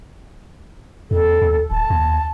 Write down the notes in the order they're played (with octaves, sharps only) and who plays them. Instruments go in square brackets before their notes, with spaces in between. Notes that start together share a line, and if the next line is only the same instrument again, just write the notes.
[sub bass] E2 [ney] A4
[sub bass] D#2
[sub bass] D1 [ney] A5
[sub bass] D#2